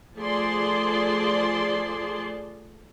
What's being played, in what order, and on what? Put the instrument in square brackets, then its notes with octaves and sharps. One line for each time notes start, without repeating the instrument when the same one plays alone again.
[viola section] F3 A3 G#4 D5 A5 C6